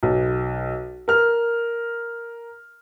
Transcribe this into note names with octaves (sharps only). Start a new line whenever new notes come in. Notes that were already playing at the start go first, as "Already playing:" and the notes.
B1
A#4 F6